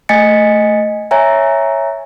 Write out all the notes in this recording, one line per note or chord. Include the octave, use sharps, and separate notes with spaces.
A3 D#5 G#5 A6 B6 C#7
C#5 E5 G#5 A#5